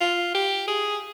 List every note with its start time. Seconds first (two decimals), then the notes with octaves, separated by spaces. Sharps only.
0.01 F4
0.35 G4
0.68 G#4